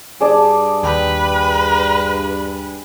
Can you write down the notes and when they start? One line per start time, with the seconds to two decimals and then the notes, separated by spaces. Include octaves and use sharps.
0.21 G2 G#4 D5 A5
0.83 D#2 B4 G5 B5